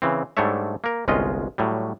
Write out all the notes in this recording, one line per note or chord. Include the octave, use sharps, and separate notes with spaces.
C#3 E3 C4
G#2 G3 A3 D4 C#5 E5
A#3 A#4
G1 C2 G#3 C#4 F4 D#5
A2 F#3 G3